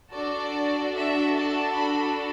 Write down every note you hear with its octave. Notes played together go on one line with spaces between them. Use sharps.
D4 F#4 A4 D5
E5
A5
B5